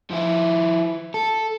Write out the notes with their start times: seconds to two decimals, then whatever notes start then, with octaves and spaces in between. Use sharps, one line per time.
0.10 F3 E4
1.14 A4